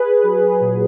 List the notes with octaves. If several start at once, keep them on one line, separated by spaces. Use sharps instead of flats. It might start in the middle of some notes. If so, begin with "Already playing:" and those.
Already playing: G#4 B4
F#3
A#2